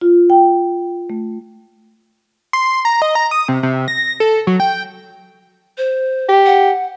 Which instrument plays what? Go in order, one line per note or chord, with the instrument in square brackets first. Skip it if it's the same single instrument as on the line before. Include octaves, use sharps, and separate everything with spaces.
[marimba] F4
G5
A3
[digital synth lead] C6
A#5
D#5
A#5
D#6
C3
C3
A#6
A4
F#3
G5
[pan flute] C5
[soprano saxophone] G4
[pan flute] F#5